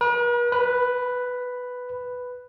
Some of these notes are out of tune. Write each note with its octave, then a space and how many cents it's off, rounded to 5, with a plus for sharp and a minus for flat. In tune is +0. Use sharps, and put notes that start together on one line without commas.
B4 -45
B4 +5